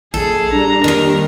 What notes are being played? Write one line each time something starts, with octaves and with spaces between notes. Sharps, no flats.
A#1 G#4 A4
G3 D4 A#5
D#2 D#3 G3 A#4